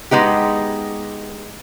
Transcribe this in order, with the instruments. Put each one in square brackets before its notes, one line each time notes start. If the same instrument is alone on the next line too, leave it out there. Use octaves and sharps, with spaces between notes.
[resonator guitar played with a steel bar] G#3 B3 D#4 G4